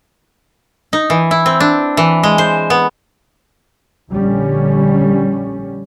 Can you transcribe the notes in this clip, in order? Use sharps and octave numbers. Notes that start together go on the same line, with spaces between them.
D#4
E3
E4
C4
D4
E3
G#3
C5
B3
A#1 D3 G3 C#4